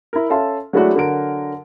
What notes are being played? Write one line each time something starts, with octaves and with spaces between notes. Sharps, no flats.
E4 A#4
C#4 A4 E5 F5 A5 C6
F#3 G#3 A3 D4 E4 F#4
D3 F#3 A#4 D7